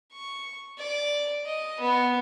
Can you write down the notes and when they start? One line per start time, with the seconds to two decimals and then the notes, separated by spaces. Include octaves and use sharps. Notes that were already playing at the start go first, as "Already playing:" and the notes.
0.13 C#6
0.78 D5
1.45 D#5
1.80 B3